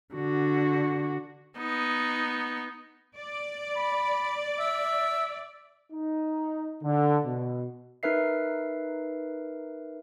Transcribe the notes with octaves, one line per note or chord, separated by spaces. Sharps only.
D3 F#4
B3 D#4
D5
B5
E5
D#4
D3
B2
D#4 A#4 B4 E5 C7